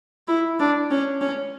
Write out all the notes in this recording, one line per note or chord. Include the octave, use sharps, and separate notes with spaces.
E4
D4
C#4
C#4